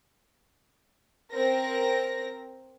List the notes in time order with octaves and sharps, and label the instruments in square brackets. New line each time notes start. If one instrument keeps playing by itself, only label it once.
[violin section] C4 A#4 A#6